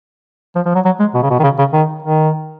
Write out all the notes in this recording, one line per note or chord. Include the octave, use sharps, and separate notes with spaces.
F3
F3
F#3
F#3
G#3
B2
C#3
B2
D#3
C#3
C#3
D#3
D#3